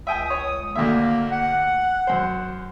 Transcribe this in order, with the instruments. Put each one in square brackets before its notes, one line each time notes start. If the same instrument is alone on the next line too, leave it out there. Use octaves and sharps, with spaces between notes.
[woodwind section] C#2 D#6 [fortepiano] E5 G5 G#5
[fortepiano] C#5
[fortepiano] D2 D3 E5 [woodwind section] A#3
[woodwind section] F#5
[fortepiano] F#2 C5